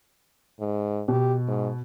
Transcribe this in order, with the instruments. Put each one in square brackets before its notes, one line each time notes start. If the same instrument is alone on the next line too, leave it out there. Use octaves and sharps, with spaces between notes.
[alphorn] G#2
[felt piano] B2 [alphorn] G4
[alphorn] G#2